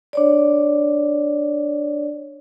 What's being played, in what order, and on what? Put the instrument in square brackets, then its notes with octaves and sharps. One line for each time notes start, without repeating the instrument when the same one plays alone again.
[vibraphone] D4 C#5 D5